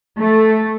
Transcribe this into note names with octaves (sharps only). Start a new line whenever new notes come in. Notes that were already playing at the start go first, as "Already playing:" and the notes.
A3